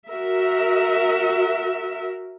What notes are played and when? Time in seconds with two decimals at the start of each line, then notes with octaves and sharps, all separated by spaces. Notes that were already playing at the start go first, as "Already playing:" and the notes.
0.10 F#4 A#4 E5